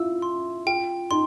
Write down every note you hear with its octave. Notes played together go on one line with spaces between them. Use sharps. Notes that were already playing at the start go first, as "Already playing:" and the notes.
Already playing: E4 F4 E6
C6
F4 G5
D#4 C6